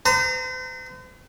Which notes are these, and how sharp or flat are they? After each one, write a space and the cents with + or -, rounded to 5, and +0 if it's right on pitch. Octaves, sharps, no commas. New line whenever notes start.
C5 -45 A#5 -25